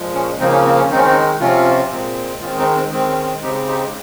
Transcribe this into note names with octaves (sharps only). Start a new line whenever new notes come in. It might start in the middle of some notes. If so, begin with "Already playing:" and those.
Already playing: A#2 F3 G#3
C#4
C#3 F3 A#3 C4 D#4
C#4
C4
C#4
D#3 G#3 C4 D#4
C#4
C4 D#4
C3 F3 C4 C#4 F4
A#2 G#3 C4
D#3 G#3 C4 C#4 F4
C4 D#4
C4
D#3 G#3 C4
C#4
C#3 G#3 C4 D#4 G4
D#4 G4